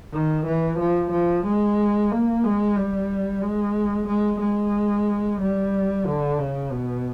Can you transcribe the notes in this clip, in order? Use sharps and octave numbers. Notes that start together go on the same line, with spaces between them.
D#3
E3
F3
F3
G#3
A#3
G#3
G3
G#3
G#3
G#3
G3
D3
C#3
B2